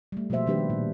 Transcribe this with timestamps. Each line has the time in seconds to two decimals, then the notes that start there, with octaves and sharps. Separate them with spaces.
0.12 G3 A3
0.30 B2 F3 A#3 F#4 C5 E5
0.46 D#3 G3 D4 G4 B4 C5
0.70 A#2